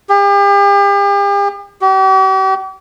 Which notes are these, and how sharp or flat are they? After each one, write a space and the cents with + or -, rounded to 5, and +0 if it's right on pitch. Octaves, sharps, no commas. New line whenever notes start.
G4 +40
G4 -45